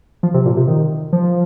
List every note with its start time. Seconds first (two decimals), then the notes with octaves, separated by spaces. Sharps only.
0.23 F3
0.34 C3
0.46 A#2
0.57 C3
0.68 D#3
1.13 F3